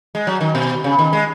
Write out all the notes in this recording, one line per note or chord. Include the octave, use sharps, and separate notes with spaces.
G#3
F#3
D#3
B2
C#3
D#3
G#3